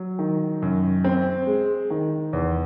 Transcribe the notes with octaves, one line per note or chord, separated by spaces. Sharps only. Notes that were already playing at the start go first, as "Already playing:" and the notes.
Already playing: F#3
D#3
F#2
C4
G#3
D#3
E2